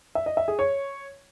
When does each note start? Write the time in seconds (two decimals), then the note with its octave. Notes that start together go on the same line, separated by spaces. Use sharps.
0.15 E5
0.26 D#5
0.37 E5
0.48 G#4
0.59 C#5